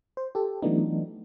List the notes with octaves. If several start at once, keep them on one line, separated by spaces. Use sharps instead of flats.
C5
G4 A4
E3 F#3 A3 B3 D4 D#4